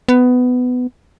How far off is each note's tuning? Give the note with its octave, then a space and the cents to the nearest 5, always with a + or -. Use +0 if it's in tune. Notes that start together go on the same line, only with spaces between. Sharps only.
B3 +15